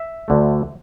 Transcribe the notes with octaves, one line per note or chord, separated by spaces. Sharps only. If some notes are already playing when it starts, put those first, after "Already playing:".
Already playing: E5
D2 D3 A3